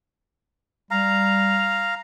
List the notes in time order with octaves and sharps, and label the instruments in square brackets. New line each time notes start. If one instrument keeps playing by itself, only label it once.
[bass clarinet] G3 [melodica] F5 A#5